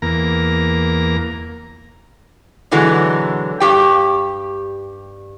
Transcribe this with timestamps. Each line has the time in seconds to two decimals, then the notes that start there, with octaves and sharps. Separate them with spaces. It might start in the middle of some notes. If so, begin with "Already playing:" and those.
0.02 E2 A#3 A#5
2.71 B2 D3 E3 F#3 G#3
3.60 G2 G4 G5